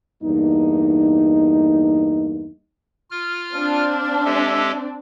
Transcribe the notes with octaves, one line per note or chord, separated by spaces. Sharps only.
E2 G2 A#3 D#4
F4 F6
C4 D4 F5
G#3 G4 A4 E5